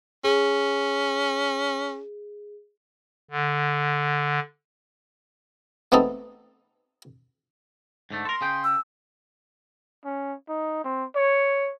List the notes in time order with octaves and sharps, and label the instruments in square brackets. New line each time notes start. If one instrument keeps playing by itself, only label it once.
[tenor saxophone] C#4 [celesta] G#4
[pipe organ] D3
[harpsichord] G#3 A3 B3 C4 D#4 A4
[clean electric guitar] G#2 D3 A3
[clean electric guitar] A4 A#4 [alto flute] C6
[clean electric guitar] C#3 G#4 G5
[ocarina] E6
[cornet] C#4
D#4
C4
C#5